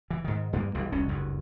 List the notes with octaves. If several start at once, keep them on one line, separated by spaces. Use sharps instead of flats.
E3
G#2 D#3
G2 G3 G#3 A#3
B1 B2 E3 G3
E1 C2 C#4
F#1 D2 G2